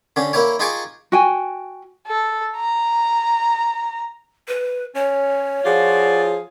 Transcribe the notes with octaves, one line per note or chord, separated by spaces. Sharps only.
D3 C#4 G4
A#3 E4 G4 C#5
D#4 F4 G4 G#4 C#6 D6
F#4 G5 G#5
A4
A#5
B4
C#4 C#5
F3 F4 F#4 G#4 D5